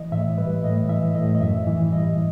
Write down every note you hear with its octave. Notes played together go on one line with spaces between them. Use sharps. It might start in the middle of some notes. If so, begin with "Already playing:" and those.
Already playing: E3 D#5
A2 E5
G3 B4
A2 D#5
E3 E5
A2 D#5
D#5
F#2 E5
E3
G3 D#5